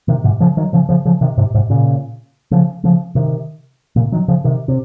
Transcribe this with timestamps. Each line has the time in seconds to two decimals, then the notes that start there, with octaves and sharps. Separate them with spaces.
0.08 C3 D#3
0.24 G#2 C3
0.40 C#3 F3
0.57 D#3 F#3
0.73 C#3 F3
0.89 C#3 F3
1.05 C#3 F3
1.21 C3 D#3
1.37 G#2 C3
1.54 G#2 C3
1.70 A#2 C#3
2.51 C#3 F3
2.84 C#3 F3
3.15 C3 D#3
3.96 A#2 C#3
4.12 D#3 F#3
4.28 C#3 F3
4.44 C3 D#3
4.68 C3